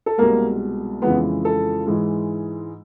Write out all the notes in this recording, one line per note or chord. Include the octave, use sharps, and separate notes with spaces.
A4
C2 B2 G#3 A#3 A#4
F2 C#3 E3 G#3 B3 B4
A4
G#2 E3 G#3